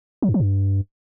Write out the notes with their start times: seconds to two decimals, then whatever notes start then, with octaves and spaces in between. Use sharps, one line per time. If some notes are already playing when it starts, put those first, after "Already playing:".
0.22 F#3
0.28 G2
0.34 F3
0.40 G2